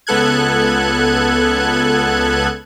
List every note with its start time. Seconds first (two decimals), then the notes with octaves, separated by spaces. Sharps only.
0.07 C#2 B3 A4 F#6 G#6